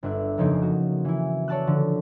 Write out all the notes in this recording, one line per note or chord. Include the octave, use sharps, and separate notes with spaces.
G1 D4 E5 F#6
F2 C#3 F3 A#3 D#4
F#4
E3 E4
C#5 D5 A5 E6 F#6
D3 F3